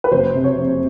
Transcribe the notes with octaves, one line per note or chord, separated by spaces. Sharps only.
B4
F#1 C5
C3
C#5
F2